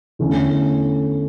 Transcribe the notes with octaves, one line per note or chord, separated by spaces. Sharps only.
E2 D3 A3 C#4 E4